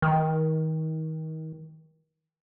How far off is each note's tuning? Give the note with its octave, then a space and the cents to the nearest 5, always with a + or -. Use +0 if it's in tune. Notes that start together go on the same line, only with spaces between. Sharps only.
D#3 +30